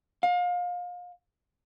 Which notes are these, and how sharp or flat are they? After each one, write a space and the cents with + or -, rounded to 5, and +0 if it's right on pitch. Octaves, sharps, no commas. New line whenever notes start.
F5 +30